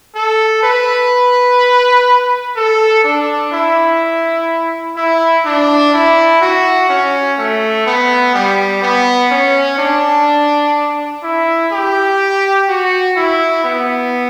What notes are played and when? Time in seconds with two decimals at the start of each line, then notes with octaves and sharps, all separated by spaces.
0.15 A4
0.63 B4
2.57 A4
3.05 D4
3.52 E4
4.97 E4
5.46 D4
5.94 E4
6.42 F#4
6.90 C#4
7.38 A3
7.87 B3
8.35 G3
8.82 B3
9.31 C#4
9.79 D4
11.23 E4
11.72 G4
12.68 F#4
13.17 E4
13.65 B3